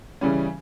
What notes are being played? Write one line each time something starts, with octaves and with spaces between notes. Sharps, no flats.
C#3 E3 G3 C#4